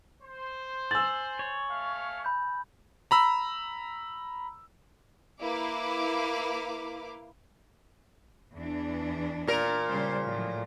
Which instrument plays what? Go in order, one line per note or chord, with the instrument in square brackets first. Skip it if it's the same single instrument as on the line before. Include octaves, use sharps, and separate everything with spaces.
[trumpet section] C5
[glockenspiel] G#5 F#7 [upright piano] E6 A6
[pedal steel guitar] C#5
[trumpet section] A3 F5
[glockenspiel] B5 G6
[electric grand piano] A#5 B5 E6
[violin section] A#3 E4 B4 F5 D6
[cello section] E2 E3 D4
[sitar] A#2 A#4
[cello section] C#3 G3 C5
A2 F3 F#3